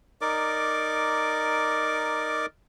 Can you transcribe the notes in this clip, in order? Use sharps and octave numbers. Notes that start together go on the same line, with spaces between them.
D#4 A#4 D5 D6